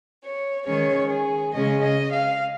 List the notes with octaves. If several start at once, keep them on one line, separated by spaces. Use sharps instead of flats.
C#5
D#3 G#3 C#4 C#5
G#4
C#3 G#3 C#4 D#5
D#5
F5